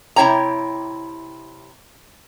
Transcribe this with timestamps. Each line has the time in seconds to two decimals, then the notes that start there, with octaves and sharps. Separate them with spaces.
0.16 C3 E4 C#5 G5 A#5